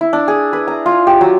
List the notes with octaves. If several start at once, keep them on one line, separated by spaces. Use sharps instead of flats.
E4
D4
G#4
B4
A#5
F4
G4
F#3